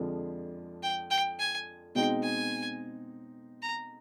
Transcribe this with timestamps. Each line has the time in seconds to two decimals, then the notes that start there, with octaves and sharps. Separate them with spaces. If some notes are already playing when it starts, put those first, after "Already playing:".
Already playing: F2 D3 F3 G#3
0.83 G5
1.10 G5
1.39 G#5
1.95 B2 G#3 C4 D#4 G5
2.22 G#5
3.62 A#5